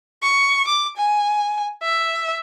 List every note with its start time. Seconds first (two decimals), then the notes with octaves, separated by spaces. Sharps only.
0.23 C#6
0.68 D6
0.97 G#5
1.82 E5